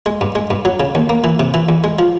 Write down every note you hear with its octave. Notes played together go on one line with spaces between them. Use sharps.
G#3
G2
G#3
G2
F#3
C#3
D#2
A#3
E3
C3
E3
E2
G#3
F3